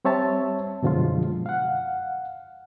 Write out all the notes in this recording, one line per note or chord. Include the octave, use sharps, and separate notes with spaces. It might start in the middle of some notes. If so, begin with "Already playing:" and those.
G3 C4 C#5 E5 A5
F#2 B2 D3 F3 G#3 F4
F5 F#5